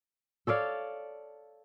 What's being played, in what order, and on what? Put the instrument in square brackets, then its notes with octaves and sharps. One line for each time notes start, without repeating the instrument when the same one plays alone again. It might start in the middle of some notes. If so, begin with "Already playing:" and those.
[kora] A4 C#5 D5 F5